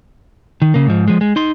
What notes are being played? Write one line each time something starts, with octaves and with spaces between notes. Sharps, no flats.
D#3
C#3 A#3
G#2 F3
F3 G#3
G#3
D#4 C6